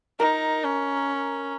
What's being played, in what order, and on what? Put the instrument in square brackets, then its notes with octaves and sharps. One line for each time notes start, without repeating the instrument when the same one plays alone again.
[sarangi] D#4 [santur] A#4
[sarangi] C#4